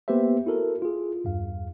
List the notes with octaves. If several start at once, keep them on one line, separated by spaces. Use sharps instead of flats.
A#3 B3 G4 B4 C5 E5
E4 F#4 A4 A#4
F4 G#4
E2 G2 F5